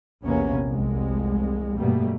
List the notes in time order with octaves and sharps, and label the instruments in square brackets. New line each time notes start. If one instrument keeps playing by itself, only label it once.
[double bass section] A#1 E2 C3 A#3 B3 C#4
F1 C2 G#3
G2 B2 G3 A3 A#3